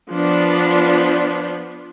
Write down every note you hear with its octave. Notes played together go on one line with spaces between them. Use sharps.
F3 B3 D4